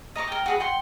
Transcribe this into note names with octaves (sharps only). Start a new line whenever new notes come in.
D#5 A#5 C#6 D6
A#4 G5
F#4 G#4 B4
F#5 G5 C6